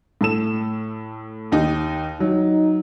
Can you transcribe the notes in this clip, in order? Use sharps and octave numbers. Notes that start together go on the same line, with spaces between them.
A2 A4 E7
D#2 D#4
F#3 D#4